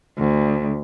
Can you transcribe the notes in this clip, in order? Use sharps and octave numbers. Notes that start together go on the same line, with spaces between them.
D2